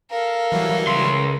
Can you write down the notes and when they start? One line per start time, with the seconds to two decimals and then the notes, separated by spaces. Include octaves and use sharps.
0.10 A4 A#4 F5
0.52 E3 F#3 G3
0.87 C#2 C6